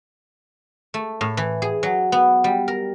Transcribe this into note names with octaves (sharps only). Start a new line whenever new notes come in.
A3
A2
E3
G#4
F#3
B3
G3
A#4